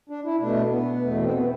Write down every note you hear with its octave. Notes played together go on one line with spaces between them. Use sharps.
D4
E4
B2 A3 D4
B3
E2 B2 A3
C4
B3